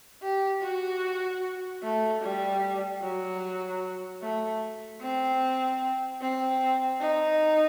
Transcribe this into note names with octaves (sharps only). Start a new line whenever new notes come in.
G4
F#4
A3
G3
F#3
A3
C4
C4
D#4